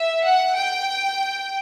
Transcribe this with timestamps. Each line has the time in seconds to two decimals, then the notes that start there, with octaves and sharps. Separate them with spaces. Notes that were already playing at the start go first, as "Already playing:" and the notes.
Already playing: E5
0.24 F#5
0.55 G5